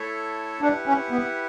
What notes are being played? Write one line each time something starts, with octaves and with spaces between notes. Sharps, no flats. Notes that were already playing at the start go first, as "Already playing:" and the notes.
Already playing: A3 E4 A4 C#5 E5
D4 E4 G4 B4 F#5
C#4
B3